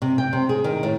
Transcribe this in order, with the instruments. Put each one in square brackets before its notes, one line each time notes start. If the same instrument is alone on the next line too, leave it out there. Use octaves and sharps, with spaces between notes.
[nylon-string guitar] C3
G5
C3
G#4
D#3
A2